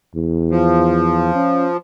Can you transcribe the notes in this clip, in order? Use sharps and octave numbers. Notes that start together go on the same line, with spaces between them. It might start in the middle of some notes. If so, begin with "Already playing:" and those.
E2
F3
C#4